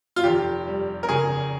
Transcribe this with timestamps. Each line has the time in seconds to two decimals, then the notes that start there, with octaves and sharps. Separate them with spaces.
0.16 F4
0.24 F1 G4
0.67 G3
1.03 A#4
1.09 C#3 G#4